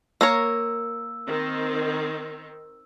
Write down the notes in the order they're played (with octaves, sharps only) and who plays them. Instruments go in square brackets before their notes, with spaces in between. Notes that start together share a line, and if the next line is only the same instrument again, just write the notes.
[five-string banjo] A#3 A#4 C#5 [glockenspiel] E6
[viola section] D#3 C4